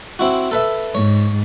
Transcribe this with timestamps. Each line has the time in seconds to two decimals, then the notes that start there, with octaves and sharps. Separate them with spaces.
0.19 C4 E4 F#4
0.51 A4 B4 E5
0.95 G#2 C#5